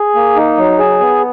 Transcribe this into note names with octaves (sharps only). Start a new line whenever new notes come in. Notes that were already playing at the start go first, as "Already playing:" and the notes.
Already playing: G#4
A#3
D#4
F#3
G#4
B3